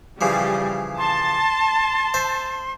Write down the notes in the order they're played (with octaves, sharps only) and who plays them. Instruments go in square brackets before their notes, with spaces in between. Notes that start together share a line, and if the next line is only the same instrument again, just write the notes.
[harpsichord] C#3 E3 F3 [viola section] G3
[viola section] A5 [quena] C6
[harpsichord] C5 E5